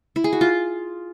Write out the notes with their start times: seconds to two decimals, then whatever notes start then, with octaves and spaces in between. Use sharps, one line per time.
0.16 E4
0.24 G#4
0.33 F#4
0.41 F4